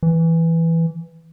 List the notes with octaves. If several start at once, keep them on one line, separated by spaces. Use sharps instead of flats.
E3